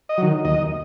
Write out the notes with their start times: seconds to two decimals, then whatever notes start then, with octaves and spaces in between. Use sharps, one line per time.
0.09 D#5
0.18 D#3 F#3
0.45 D#2 D#5